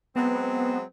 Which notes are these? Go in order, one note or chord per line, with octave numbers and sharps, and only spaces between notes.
F#3 G#3 B3 C4